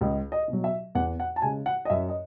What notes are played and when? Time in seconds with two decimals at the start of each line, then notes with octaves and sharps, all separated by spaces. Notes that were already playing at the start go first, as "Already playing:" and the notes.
0.01 C#2 D#5
0.32 D#5
0.48 B2 F#3
0.64 E5
0.95 E2 F#5
1.20 F#5
1.36 A5
1.42 C#3 G#3 G#5
1.66 F#5
1.85 D#5
1.90 F#2 E5
2.09 D#5